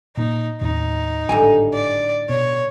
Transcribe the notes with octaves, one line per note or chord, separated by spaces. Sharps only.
A#2 A#3 D#4
D#2 A2 D#4
G#1 A2 D3 G3 G#5
D5
B2 C#5